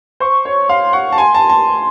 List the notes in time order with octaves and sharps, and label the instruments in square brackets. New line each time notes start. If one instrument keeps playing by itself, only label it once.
[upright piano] C5 [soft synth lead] C#6
[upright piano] C#5
[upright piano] F5 [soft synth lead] C6
[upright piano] F#5 [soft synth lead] C#6
[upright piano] A5
[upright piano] G#5 [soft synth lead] C6
[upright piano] A5
A5